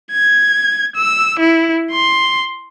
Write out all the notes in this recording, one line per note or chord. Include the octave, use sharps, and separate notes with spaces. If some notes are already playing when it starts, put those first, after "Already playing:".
G#6
E6
E4
C6